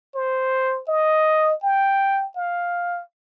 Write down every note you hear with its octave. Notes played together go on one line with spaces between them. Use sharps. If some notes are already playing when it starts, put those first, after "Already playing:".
C5
D#5
G5
F5